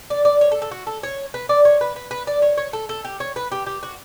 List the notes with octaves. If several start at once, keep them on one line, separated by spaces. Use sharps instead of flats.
D5
D5
C#5
A4
A4
F#4
A4
C#5
B4
D5
C#5
B4
B4
B4
D5
C#5
C#5
A4
A4
G4
C#5
B4
G4
G4
F#4